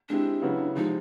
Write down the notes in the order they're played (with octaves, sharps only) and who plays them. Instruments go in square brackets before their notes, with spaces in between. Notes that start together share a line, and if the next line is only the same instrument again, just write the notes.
[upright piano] G#3 C4 E4 G4 [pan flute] D4
[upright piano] C#3 F#3 B3 E4
[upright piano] C3 F3 G#3 [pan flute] D#4